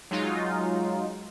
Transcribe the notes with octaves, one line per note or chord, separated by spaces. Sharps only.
F#3 G#3 D#4 F4